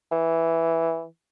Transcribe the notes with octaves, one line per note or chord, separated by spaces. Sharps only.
E3